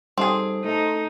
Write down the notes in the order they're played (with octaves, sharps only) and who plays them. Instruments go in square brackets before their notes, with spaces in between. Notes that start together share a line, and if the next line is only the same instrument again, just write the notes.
[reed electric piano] G3 D#4 A4 [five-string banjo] C4 G#4
[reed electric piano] A3 A4 [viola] D#4